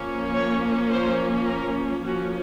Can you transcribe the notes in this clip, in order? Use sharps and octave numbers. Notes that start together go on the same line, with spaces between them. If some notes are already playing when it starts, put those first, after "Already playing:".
Already playing: F3 A#3 C#4
C#5
C5
A#4
F3 A#3 C#4 F#4